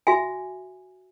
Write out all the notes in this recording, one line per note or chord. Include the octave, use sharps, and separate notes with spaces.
F#4 E5 G#5